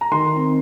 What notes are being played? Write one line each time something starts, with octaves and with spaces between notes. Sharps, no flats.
A#5
D#3 C6
C4 D#4